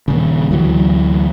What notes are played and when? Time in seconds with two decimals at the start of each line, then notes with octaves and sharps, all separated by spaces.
0.08 D#1 C#3
0.51 D2 E3 F#3